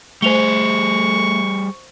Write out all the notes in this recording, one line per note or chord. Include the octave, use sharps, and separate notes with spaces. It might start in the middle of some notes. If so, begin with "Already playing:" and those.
G3 A3 G#4 C5 C#6 F7 G7